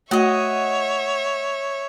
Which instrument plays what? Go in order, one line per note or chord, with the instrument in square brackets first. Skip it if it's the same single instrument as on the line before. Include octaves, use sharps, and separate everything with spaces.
[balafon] A3 F#4 [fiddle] C#5 E5 [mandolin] D#5 F#5